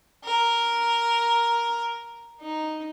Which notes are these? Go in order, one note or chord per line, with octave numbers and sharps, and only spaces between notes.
A#4
D#4